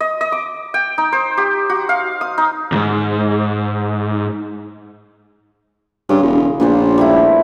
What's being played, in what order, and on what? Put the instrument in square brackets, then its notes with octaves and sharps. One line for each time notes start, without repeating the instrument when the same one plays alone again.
[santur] D#5
D#5
D6
G5
D#4
C5
G4
F#4
F5
D#6
D#4
[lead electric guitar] D2 G#2
[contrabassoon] G2 [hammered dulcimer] C#3 C6
[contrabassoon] E1
[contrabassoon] A#1 [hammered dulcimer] A#2 B3 C5
[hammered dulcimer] G3 A3 E4